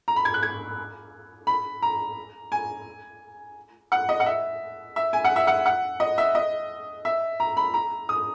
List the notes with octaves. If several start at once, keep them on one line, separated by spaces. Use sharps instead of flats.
A#5
B5
G#6
F#6
G#6
B5
A#5
G#5
F#5
D#5
F#5
E5
E5
G#5
F#5
E5
F#5
F#5
D#5
E5
D#5
E5
A#5
B5
A#5
D#6